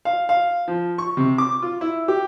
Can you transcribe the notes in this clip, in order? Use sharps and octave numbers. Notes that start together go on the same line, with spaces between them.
F5
F5
F3
C#6
C3
D6
F4
E4
G4